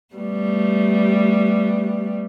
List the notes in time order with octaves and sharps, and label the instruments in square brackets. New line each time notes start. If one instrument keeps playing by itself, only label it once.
[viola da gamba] G3 A3 B3